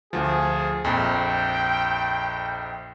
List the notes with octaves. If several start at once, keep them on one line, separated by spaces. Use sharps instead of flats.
D2 F3 G#4
A#1 F2 G5